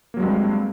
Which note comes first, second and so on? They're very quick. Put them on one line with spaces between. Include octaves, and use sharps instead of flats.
A#3 F#3 G#3 G2 C4